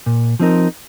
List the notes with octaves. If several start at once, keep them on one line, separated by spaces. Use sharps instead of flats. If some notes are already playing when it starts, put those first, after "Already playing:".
A#2
F3 C4 D#4 A#4